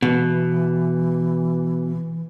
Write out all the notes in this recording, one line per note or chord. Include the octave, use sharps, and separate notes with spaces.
B2 E3